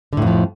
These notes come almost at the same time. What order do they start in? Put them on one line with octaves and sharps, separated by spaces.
D3 A2 F2 F3